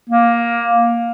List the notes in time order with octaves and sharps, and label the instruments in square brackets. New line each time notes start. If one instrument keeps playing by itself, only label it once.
[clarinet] A#3